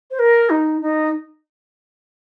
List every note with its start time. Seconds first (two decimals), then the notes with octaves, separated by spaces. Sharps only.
0.10 C5
0.19 A#4
0.49 D#4
0.81 D#4